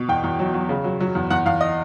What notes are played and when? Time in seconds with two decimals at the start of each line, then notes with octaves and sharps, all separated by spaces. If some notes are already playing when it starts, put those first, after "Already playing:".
Already playing: B2
0.09 E2 G5
0.24 E2
0.39 F#3
0.54 F#3
0.69 C#3
0.84 F#3
1.00 F#3
1.15 E2
1.30 E2 F#5
1.46 E2 F5
1.61 D#5